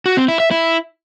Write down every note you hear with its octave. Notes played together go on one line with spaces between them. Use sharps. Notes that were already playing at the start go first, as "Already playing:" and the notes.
F#4
C4
E4
E5
E4